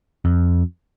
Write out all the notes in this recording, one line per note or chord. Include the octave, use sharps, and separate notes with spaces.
F2